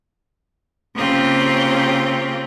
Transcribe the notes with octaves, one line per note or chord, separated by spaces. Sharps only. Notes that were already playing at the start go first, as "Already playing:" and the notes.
C#3 A#3 C4 F4 G4